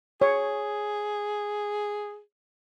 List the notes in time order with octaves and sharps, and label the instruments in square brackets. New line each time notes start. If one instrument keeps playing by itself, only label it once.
[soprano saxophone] G#4 [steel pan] C#5